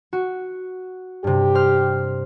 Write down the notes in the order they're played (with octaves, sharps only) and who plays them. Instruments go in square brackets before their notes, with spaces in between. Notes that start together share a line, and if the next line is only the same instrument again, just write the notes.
[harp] F#4
[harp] G2 C3 [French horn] G4
[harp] C5 F6